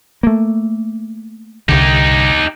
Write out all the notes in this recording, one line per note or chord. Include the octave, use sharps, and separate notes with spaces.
A3 A#3
C2 D3 D#4 G4